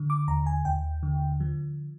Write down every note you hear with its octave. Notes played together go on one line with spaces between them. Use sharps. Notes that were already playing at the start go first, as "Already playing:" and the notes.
Already playing: D3
D6
D#2 A#5
G#5
D#2 G5
D3
F3